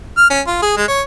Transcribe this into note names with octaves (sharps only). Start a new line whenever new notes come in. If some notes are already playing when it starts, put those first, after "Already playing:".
F6
C#4
F4
G#4
G#3
C#5